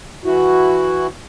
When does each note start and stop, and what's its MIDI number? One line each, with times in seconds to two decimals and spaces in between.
0.25 1.07 52
0.25 1.07 64
0.25 1.07 66